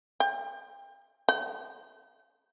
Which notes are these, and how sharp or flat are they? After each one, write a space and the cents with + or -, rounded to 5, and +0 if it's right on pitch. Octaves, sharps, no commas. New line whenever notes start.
G5 +35
G5 -40